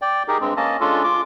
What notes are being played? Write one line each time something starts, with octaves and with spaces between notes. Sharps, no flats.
D5 G5
D#4 G4 G#4 A#4
G2 G#3 C4
A#3 C#4 D#5 A5
G#3 C#4 D4 F4 A4
F4 D6